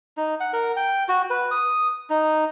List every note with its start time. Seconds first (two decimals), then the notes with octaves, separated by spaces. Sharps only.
0.17 D#4
0.40 F#5
0.53 A#4
0.77 G5
1.09 F#4
1.30 B4
1.51 D#6
2.10 D#4